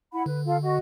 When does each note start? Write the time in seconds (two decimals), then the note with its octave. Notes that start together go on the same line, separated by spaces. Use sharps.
0.12 E4 F#5 B5
0.26 D3 B4
0.46 F4 A4 F5
0.62 F#4 D#5